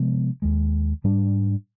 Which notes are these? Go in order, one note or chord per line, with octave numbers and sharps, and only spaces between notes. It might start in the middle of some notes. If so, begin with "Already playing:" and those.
Already playing: C3 F3 G#3 B3
D#2 D#3 G#3
G#2 G3 D4